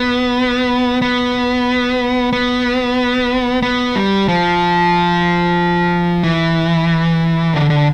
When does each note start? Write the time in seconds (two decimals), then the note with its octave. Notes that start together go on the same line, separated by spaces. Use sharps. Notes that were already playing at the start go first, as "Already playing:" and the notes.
Already playing: B3
1.02 B3
2.33 B3
3.62 B3
3.95 G3
4.28 F3
6.23 E3
7.54 D3
7.70 D3